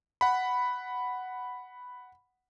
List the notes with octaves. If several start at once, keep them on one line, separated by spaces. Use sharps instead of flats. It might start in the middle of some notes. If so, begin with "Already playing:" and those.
F#5 B5